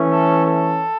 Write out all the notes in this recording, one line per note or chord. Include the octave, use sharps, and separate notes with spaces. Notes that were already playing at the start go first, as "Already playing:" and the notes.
Already playing: E3 A3 C#4
A4
A4